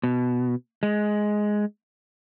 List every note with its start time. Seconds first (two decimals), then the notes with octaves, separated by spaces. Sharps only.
0.03 B2
0.83 G#3